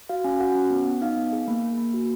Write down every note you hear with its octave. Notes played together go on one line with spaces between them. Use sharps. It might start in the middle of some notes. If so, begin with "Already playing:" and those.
F#4 F5
C#4 G#5
F#4 F#5
C#4
B3
B3
D#4 F5
B3
G#4
A#3
A#3
A#3
F#4